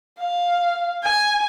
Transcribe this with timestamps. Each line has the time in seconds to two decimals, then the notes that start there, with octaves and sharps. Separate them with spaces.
0.19 F5
1.03 G#5